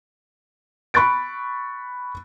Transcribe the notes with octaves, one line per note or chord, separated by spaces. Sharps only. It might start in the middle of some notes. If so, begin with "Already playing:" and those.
B5 C#6 F#6 A6 D7